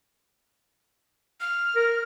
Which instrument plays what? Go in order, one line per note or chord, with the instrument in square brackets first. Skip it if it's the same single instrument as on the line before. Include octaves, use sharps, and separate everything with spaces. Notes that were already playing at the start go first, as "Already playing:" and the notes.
[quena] F6
[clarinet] A#4